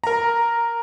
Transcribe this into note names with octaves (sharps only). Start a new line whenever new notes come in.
A#4 A#5